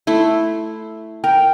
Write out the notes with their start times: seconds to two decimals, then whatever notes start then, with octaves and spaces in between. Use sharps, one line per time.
0.07 A3 E4 C6
1.24 A#4 G5